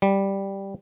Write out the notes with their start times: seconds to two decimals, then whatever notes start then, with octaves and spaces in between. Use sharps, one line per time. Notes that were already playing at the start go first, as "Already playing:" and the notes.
0.02 G3